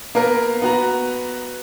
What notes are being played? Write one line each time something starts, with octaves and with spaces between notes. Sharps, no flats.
A#3 B3 A#4
B3 F#4 A#5